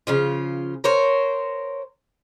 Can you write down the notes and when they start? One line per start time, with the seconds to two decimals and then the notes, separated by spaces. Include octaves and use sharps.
0.07 C#3 F3 F4
0.84 A#4 C5 C#5